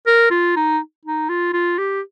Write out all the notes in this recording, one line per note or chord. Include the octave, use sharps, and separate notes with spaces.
A#4
F4
D#4
D#4
F4
F4
G4